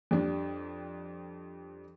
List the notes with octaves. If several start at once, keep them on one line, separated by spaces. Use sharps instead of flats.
F2 G3 D4